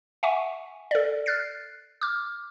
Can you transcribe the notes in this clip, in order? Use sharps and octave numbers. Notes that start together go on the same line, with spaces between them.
E5 F#5 G#5 C#6
A4 D5
F6 F#6 A6 C7
D6 F6